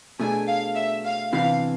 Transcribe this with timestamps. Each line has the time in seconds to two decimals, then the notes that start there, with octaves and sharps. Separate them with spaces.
0.19 B2 A3 D4 G#4 G#5
0.48 F5
0.76 E5
1.05 F5
1.32 C3 E3 B3 D4 F5